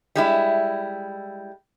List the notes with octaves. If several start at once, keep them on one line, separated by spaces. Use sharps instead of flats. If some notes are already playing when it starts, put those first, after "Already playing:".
G3 G#3 E4